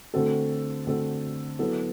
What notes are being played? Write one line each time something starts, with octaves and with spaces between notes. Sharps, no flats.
D3 A3 C4 F#4 A4
D3 A3 C4 F#4 A4
F#3 B3 E4 A4